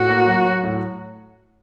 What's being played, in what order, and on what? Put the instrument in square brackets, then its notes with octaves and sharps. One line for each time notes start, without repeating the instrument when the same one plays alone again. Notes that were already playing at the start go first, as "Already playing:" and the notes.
Already playing: [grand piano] A2 [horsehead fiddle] F#4
[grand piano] A#3
F#3
F#3
A2